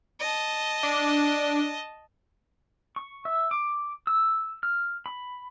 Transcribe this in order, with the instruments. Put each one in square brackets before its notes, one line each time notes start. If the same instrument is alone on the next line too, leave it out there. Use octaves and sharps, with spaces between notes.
[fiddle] D#5 A5
[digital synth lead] D4
[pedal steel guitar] C#6
E5
D6
E6
F6
B5